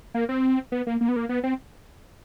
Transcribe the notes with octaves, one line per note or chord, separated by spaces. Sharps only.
A#3
C4
B3
A#3
A#3
B3
A#3
B3
C4